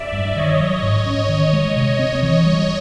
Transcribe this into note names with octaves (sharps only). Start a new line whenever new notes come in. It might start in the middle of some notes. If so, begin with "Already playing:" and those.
Already playing: D5 E5
G2
D#3 C#5 D#5
F#3
G#2
C#4
D#3
G#3
C3 C#5 D#5
C4
E3 C#5 D#5
G3